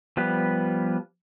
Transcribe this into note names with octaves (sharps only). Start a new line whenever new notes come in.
F3 G3 B3 B4